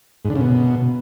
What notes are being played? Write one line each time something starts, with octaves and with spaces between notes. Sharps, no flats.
G#2
D3
C#3
B2